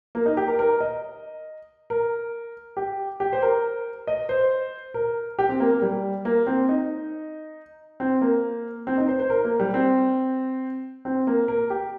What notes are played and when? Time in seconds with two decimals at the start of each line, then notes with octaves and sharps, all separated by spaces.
0.15 A#3
0.26 D#4
0.37 G4
0.48 A#4
0.59 A#4
0.80 D#5
1.90 A#4
2.77 G4
3.20 G4
3.33 C5
3.42 A#4
4.07 D#5
4.29 C5
4.94 A#4
5.39 G4
5.49 C4
5.60 A#3
5.71 A#3
5.82 G3
6.25 A#3
6.47 C4
6.69 D#4
8.00 C4
8.21 A#3
8.87 C4
8.98 D#4
9.08 C5
9.20 C5
9.30 A#4
9.45 A#3
9.60 G3
9.74 C4
11.05 C4
11.27 A#3
11.48 A#4
11.70 G4